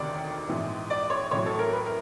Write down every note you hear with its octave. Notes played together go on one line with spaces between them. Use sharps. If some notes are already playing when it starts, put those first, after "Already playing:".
Already playing: E1 D2 C3 D#3 D5
A#1 G#2 E3
D5
C#5
A1 A2 F#3 C#5
A4
A#4
B4
A#4